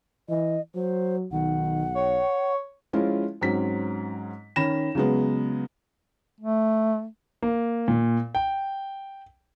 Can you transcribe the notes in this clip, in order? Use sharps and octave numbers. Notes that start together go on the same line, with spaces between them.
E3 D#5
F#3 C5
B1 D#3 F#5
C#5
F3 G#3 C#4 E4 F4
G#2 F#3 C4 C#4 B6
D#3 C#4 B5 A#6 E7
C#3 F#3 G#3 B3
A3
A#3
A#2
G5